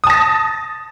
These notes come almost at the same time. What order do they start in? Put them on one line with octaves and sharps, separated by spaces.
D#6 A5 A#6 A6